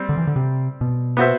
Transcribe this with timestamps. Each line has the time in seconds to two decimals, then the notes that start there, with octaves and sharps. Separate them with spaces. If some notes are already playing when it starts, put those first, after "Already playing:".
Already playing: G3 C4
0.09 D3
0.17 E3
0.27 D3
0.36 C3
0.81 B2
1.17 B3 F#4 C5 E5